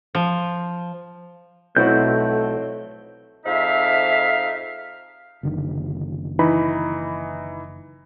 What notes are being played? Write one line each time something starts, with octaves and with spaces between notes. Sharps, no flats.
F3
B1 A3 C4 E4 F#4 G6
F2 G#2 D#4 E5 F5
F#1 D3 D#3
E3 D#4 B5